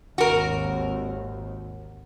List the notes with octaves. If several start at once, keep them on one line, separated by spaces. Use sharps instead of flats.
G#1 D#2 F#4 A#4